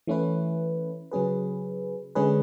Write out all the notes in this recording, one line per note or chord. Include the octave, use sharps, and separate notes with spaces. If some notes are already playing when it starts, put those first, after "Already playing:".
E3 A3 C#4 E4 B4
C#3 F#3 C#4 G#4 B4
D3 G#3 C#4 G#4 B4